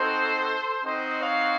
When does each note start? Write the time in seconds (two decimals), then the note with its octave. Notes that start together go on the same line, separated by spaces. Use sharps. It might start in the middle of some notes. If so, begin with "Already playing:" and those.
Already playing: C4 D#4 F#4 A4 C5
0.84 C4 D#4 F#4 C5 D#5
1.20 C#5 F5